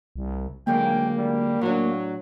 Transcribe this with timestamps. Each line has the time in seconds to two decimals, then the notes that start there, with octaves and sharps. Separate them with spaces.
0.16 C2
0.67 D2 F#3 G#3 A#3 G5
1.18 G3
1.61 A2 F#3 D4